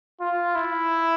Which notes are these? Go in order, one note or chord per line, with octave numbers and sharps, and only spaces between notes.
F4
E4